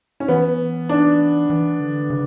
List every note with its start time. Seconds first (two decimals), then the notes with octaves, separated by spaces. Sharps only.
0.20 C#4
0.28 E3 B3
0.89 D4
1.50 E3
1.80 D3
2.10 C#3